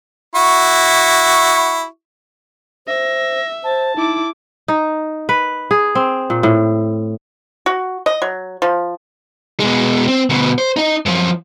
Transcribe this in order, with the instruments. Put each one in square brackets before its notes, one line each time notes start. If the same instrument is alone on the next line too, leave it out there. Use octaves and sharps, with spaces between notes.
[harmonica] E4 F#4 C#6
[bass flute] C5 [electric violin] E5 [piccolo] A#6
[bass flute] C5 [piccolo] A5
[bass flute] D#4 [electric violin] E4 D6
[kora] D#4
B4
G#4
C4
A#2
A2
[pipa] F#4
D#5
F#3
F3
[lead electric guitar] B2 G#3
C4
D2 B2
C5
D#4 D#5
F#2 F3